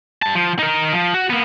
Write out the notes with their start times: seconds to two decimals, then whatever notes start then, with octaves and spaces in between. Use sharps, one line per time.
0.22 G3 A5
0.35 F3
0.59 D#4 A#4
0.93 F3
1.14 F#4
1.30 A#3 B3